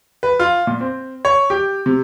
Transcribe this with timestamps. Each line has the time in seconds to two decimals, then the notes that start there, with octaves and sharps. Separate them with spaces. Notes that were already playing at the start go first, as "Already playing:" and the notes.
0.23 B4
0.39 F4
0.67 A#2
0.81 C4
1.25 C#5
1.50 G4
1.86 C3